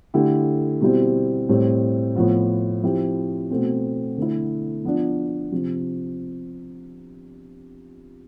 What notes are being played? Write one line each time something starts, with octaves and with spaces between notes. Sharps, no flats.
D3 A3 E4 G4
B2 G3 C4 E4 G4
A2 G3 C4
A2 F3 B3 F4
F3 C4 E4 G4
B2 A3 C4
D3 A3 E4
F3 B3 D4 F4
C3 F3